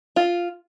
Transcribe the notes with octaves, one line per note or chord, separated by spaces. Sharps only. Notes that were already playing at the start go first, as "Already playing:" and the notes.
F4